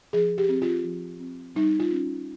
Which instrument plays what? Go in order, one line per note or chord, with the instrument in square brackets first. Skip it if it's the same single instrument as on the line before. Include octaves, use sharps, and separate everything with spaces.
[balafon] F3 G#4
G4
C4
F4
F3
C4
G3 D#4
F4
C#4